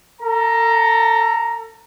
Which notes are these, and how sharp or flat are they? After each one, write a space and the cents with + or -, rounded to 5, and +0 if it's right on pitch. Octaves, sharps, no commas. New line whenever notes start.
A4 +35 A#5 +5